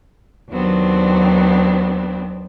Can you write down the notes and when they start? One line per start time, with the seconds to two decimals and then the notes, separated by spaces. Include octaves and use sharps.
0.51 D#2 F#3 B3 C4 D4